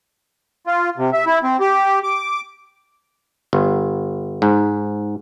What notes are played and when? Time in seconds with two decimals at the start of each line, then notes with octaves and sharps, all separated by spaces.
0.67 F4
0.98 C3
1.13 E5
1.26 E4
1.43 C4
1.60 G4
2.03 D6
3.53 G1
4.42 G#2